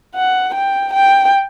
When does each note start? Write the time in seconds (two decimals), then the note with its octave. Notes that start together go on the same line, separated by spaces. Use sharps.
0.15 F#5
0.54 G5
0.93 G5